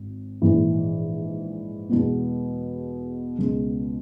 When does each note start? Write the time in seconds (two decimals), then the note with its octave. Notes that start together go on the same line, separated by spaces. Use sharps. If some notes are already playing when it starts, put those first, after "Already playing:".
Already playing: G#1
0.42 A#1 G#2 E3
1.89 E2 B2 G#3 B3
3.38 C#2 B2 G#3